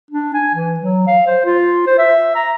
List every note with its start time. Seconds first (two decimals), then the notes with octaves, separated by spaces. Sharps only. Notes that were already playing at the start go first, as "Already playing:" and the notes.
0.11 D4
0.34 G#5
0.55 E3
0.80 F#3
1.07 F5
1.27 C5
1.45 F4
1.87 C5
1.98 E5
2.35 A#5